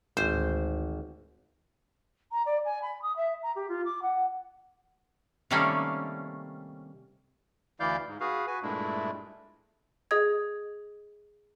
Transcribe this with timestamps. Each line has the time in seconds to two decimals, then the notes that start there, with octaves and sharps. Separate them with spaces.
0.17 G#1 D2 A2 C5
2.31 A#5
2.45 D5
2.65 G#5
2.82 B5
3.02 D#6
3.16 E5
3.43 A#5
3.55 G4
3.68 F4
3.85 D6
4.02 F#5
5.51 C3 D#3 G3 A3 A#3 C#4
7.80 D2 E3 E4 D5 F5 G6
8.07 G#2
8.20 F#4 G#4 B4 F5
8.47 F#4 B4 G#5
8.62 G2 A#2 G#3 A3 D4 E4
10.11 G#4 D#5 D#6 G#6